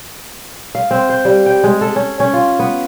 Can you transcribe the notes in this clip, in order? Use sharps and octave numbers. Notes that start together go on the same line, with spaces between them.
F5
C4
C5
G3
G5
G#3
A4
C#4
C#4
F4
B3